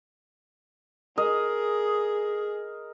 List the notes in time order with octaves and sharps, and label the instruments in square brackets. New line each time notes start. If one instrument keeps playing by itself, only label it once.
[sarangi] G#4 [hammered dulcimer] A#4 D#5